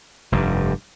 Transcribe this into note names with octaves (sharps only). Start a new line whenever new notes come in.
F1 G2